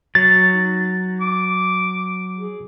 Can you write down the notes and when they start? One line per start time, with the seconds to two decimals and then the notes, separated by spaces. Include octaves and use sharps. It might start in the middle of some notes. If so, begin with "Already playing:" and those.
0.15 F#3 A6
0.51 D#4
1.20 D6
2.38 G#4